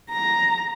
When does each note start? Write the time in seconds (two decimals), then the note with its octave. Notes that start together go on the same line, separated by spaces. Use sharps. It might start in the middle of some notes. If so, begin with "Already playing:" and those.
0.10 A#5